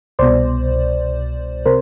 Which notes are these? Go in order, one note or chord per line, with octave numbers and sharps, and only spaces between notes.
C2 B2 C5 D5
C3 A#4 C5